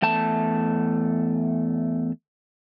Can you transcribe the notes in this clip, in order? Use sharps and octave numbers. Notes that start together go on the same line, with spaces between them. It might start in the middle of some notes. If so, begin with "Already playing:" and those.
E2 A3 A5